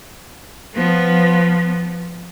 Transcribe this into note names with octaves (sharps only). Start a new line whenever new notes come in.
F3 B3